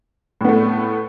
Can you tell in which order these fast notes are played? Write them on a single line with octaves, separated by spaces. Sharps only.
A2 B3 A3